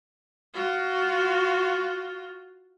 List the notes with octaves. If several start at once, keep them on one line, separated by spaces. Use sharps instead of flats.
F4 F#4